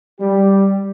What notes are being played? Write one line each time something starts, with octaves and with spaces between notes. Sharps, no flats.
G3 G4